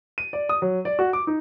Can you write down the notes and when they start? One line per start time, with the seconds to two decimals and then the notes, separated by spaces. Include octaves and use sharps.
0.18 D#7
0.33 D5
0.49 D#6
0.62 F#3
0.85 D5
0.99 F#4
1.13 D6
1.27 D#4